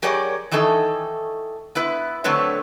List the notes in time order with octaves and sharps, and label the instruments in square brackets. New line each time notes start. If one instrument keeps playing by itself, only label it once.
[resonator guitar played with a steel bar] F#3 G4 G#4 A#4 C#5 D5
D#3 E3 C#4 D#4 A4
B3 E4 B4
D3 F#3 A3 C4 B4 C#5